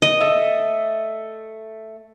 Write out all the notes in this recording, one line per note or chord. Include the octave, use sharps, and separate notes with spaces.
D#5
A3 E5